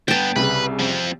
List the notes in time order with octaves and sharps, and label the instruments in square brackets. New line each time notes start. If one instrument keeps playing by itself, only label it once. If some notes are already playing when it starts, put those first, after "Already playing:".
[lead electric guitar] G2 B3 [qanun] G5 A5
[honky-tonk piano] C2 C#3 [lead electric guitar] B4
[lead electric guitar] F3 C4